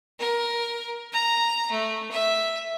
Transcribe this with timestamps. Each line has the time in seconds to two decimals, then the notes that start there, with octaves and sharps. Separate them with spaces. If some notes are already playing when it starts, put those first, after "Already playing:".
0.19 A#4
1.12 A#5
1.71 A3
2.11 E5